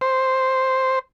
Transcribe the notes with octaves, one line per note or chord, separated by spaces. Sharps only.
C5